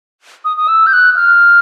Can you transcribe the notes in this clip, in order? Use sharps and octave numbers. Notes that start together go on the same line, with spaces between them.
D#6
D#6
E6
G6
F#6
F6